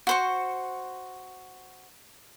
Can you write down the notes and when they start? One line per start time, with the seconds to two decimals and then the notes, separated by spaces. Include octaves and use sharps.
0.07 F#4 C5 C#6